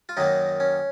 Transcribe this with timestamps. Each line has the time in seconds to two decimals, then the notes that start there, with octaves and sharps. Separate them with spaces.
0.09 F4
0.17 F#2 D#3 F#3 A#3 D#4
0.60 C#4